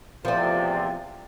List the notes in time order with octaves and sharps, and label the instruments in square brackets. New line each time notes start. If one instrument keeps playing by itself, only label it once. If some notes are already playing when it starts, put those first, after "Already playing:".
[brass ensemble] A1 E2 C3 [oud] F3 C4 [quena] D5